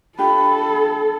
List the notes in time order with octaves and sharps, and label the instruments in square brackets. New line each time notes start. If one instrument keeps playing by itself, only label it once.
[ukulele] D4 F4 G4 [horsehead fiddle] A4 [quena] B5